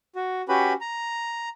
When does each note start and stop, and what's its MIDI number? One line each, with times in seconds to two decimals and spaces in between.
0.15 0.42 66
0.49 0.73 61
0.49 0.73 66
0.49 0.73 67
0.49 0.73 71
0.49 0.73 83
0.81 1.49 82